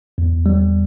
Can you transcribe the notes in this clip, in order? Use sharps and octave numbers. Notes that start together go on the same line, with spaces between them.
E2
G3